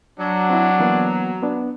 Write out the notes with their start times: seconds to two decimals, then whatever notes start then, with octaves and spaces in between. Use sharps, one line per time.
0.19 F#3 D4
0.50 C4 E4
0.79 E3 A#3 B3
1.42 B3 D4